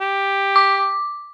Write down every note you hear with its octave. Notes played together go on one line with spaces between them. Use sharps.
G4
D6